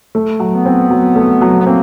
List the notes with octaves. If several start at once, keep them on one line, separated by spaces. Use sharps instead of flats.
A3
F#3
B3
C4
F#3
A3
F#3
B3
A#3 C4